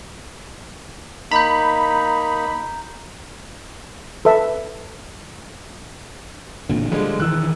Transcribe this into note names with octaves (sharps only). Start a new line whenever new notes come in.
A#3 D#4 A#5 B5 G6
A4 B4 E5
A1 A#2 D3
D3 F3 G3 G#3
E1 D#3 E3 E6 F#6